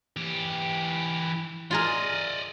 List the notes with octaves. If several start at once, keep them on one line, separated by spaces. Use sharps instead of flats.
E3 G4
F4 G#4 A#4 D5 D#5